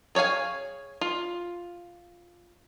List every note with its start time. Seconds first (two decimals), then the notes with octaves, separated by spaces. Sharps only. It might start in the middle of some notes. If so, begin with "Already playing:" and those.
0.15 G#4 C#5 D5 F5 G#5
1.01 F4